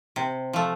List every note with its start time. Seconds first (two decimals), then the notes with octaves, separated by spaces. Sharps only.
0.16 C3
0.53 F3 A3